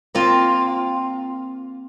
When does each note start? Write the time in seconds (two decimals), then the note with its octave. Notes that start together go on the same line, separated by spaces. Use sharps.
0.15 A#3 C4 F4